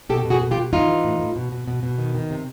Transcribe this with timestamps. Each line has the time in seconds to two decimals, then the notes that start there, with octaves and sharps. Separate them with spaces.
0.09 B2 G4 A4
0.25 B2
0.30 F#4 G#4
0.42 B2
0.51 F4 G4
0.57 B2
0.73 E3 D#4 F4
0.88 E3
1.04 A2
1.20 A2
1.36 B2
1.52 B2
1.68 B2
1.83 B2
1.98 D#3
2.15 D#3
2.30 C3